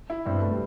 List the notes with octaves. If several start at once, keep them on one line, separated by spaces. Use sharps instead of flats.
E4
G2 C4
B3
A3
G3